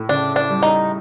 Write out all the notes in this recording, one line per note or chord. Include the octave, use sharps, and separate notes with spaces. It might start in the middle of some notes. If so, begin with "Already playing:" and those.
Already playing: A2
C#3 D4
D4
G3
D#4